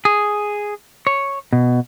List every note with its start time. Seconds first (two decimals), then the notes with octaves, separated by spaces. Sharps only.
0.05 G#4
1.07 C#5
1.53 B2